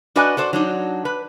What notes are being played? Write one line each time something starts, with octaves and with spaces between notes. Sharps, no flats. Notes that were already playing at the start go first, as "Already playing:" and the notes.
D4 F#4 B4 D5 D#5 G#5
F#4 A4 C5 D5
F#3 D4 D#4
B4